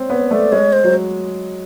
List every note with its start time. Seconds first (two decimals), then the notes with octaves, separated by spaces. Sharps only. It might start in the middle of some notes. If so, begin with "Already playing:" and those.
Already playing: C4 C#4
0.09 B3 C#5
0.31 A3 D5
0.52 G#3 C#5
0.73 C5
0.84 F#3